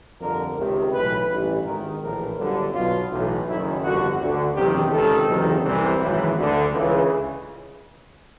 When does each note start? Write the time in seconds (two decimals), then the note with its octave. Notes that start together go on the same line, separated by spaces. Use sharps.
0.19 G1 F2 D3 A#4
0.56 C#2 C3 D#3
0.92 B1 A2 E3 B4
1.28 A1 G2 E3
1.64 G#1 G#2 D#3 A#4
2.01 A#1 A2 E3 A#4
2.37 G1 F#2 D3
2.74 B1 B2 F4
3.10 B1 A2 E3
3.46 F#1 F#2 D#3 E4
3.83 G1 F2 D3 F#4
4.19 D2 D3
4.55 F#1 E2 C3 D#3 G4
4.91 C#2 C3 D#3 A4
5.27 F#1 E2 C3 D#3
5.63 C2 C3 E3
6.00 G#1 F#2 C#3 E3
6.36 D2 D3
6.73 C#2 C#3 E3